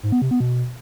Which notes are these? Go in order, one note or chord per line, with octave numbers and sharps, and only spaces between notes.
G#2
B3
C3
B3
B2